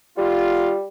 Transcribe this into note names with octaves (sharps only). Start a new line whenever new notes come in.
G3 F4